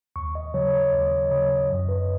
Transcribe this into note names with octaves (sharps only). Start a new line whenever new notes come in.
D#2 C#6
D#5
C#3 F#3 C#5
C#5
D#2 D#5
C#3 F#3 C#5
D#5
F#2 D#5
B4